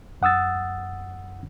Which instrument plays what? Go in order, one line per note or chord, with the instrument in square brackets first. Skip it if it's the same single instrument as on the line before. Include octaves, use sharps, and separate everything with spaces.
[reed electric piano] F#2 F#5 D#6 E6 A6